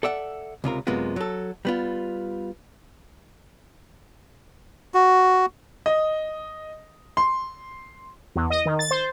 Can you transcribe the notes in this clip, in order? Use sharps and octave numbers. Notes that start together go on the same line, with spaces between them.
A4 D5 E5 F#5
C#2 C3 F4 A#4
F#2 C3 G#3 A#3 B3 F4
F#3 A4
G3 B3 F4
F#4
D#5
C6
E2
D#5
D#3
A6
C5